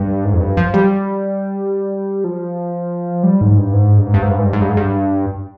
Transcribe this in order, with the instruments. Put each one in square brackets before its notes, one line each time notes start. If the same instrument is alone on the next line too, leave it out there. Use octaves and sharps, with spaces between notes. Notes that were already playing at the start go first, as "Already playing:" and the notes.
Already playing: [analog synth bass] G2
G#2
F2
G2
F3
G3
F3
G3
G#2
G2
G#2
G2
G#2
G2
G#2
G2
G#2
G2
G#2
G2
G#2
G2